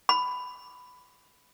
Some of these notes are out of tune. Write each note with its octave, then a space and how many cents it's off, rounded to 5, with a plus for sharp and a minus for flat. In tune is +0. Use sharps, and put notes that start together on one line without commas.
B5 +10